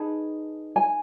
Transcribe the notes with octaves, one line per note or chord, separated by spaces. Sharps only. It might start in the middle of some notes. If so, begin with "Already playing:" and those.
Already playing: D#4 G#4 B4 A5
G#5